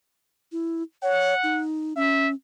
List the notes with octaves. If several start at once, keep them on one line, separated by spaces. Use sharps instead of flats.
E4
C#5 F#5
D#4
C#4 E5